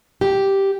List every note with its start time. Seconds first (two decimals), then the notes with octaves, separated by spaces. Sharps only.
0.21 G4